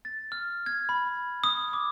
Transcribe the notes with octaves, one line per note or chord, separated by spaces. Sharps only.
A6
F6
G#6
B5
D#6
D6